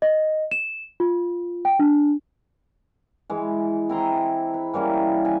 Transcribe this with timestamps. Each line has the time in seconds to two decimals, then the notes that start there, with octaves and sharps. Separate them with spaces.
0.02 D#5
0.51 E7
1.00 F4
1.65 G5
1.79 D4
3.30 E3 G#3
3.89 C4 E4 A#5 C6
4.54 B4
4.74 E3 G3 A#3 C#4
5.25 G#5